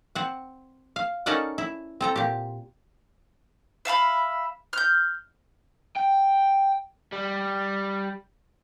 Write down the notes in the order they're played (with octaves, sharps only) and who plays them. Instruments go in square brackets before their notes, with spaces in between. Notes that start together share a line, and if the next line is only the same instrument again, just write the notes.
[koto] C4 F#5
F5
C#4 D#4 A4 A#4 D5 F#5
E4
C4 A4 A#5
A#2 G4
[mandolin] E5 F5 A5 B5
F6 G6
[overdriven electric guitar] G5
G3